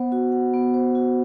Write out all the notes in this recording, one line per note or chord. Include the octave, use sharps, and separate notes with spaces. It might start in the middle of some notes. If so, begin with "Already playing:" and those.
Already playing: B3 C5 F#5
F#4
F#5
B3
C5
F#4